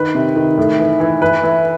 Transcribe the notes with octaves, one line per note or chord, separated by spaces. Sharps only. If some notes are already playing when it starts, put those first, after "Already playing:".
Already playing: D#3 B4
C3
D#3
A2
E3
E3
E3 B4
E3